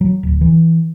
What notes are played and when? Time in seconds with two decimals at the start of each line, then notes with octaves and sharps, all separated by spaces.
0.01 F#3
0.23 D1
0.41 E3